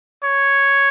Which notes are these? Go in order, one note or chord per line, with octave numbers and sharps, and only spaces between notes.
C#5